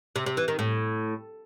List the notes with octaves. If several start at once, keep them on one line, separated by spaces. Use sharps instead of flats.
C3
C3
E3
D#3
A2